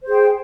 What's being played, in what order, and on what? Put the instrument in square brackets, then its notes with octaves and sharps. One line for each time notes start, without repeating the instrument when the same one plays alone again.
[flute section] C5
G#4
G5